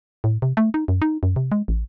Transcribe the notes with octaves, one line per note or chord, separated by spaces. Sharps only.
A2
C3
A3
D#4
F#2
D#4
F#2
C3
G#3
A1